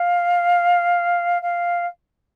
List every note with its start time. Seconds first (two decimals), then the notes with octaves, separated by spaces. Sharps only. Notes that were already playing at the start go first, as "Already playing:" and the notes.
Already playing: F5
1.42 F5